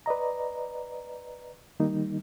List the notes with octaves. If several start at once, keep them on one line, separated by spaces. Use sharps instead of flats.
B4 D5 D#5 A#5
D#3 G3 A#3 D#4